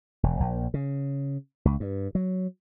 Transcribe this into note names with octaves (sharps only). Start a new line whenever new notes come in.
E1
A#1
C#3
C#2
G2
F#3